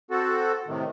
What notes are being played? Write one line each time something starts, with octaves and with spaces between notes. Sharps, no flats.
C4 F#4 A4
A2 C3 D#3